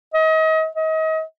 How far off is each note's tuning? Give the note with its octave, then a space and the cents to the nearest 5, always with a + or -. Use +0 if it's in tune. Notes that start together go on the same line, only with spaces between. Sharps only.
D#5 +35
D#5 +35